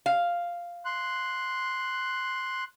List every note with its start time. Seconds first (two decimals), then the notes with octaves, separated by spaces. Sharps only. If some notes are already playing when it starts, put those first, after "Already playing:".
0.06 F5
0.85 C6 F#6